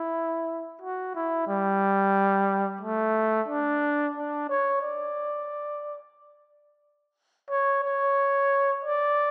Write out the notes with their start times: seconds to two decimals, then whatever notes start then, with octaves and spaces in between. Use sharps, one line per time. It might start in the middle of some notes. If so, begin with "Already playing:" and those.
Already playing: E4
0.82 F#4
1.15 E4
1.48 G3
2.81 A3
3.48 D4
4.16 D4
4.49 C#5
4.82 D5
7.50 C#5
7.83 C#5
8.85 D5